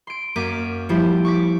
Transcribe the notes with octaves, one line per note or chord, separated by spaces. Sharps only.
C6 D7
F#2 A#3 D6 B6 D#7
F3 G3 E4 G4
C#6 D6 B6